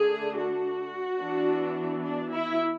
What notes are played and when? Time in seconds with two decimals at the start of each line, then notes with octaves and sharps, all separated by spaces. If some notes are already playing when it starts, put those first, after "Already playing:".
Already playing: D3 A3 D4 G#4
0.36 F#4
1.19 E3 B3 D4
2.04 D4
2.32 E4